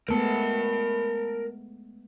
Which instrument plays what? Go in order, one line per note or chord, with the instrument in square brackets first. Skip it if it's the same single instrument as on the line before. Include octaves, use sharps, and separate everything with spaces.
[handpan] G#3 A3 B3 [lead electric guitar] A#4 A5